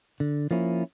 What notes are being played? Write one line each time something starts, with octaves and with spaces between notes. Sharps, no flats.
D3
F3 A#3 C#4 E4